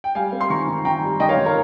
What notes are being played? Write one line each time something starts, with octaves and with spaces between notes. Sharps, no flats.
G5
G3 F5 G#5
C4
C6
D#3 A#5 C#6
D#3
D#3 G5 A#5
G3
D#3 D#5 G5
C#5 F5
D#3
A#4 C#5